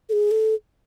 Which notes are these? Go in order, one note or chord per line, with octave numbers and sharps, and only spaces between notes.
A4
G#4
A4